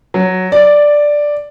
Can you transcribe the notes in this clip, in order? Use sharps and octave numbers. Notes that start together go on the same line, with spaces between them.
F#3
D5